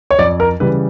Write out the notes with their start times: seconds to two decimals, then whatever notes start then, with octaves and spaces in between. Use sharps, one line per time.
0.11 C#5
0.19 F2 D5
0.40 A#4
0.60 C#3 E3 G3 B4